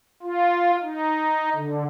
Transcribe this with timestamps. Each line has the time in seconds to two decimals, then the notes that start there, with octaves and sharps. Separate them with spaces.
0.23 F4
0.82 D#4
1.56 D3